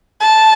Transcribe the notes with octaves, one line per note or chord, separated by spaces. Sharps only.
A5